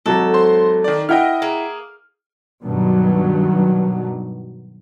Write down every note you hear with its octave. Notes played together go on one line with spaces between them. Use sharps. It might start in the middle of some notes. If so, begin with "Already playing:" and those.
G#1 F#3 A4
C5 C6
D#3 D5
E4 D#5 F#5 G5 F6
A#3 G#4
G2 B2 D#3 F#3